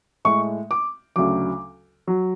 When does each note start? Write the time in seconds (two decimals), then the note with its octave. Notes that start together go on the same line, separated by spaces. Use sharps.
0.25 A2 G#3 C#6
0.71 D6
1.16 D2 C#3 F#3 D6
2.07 F#3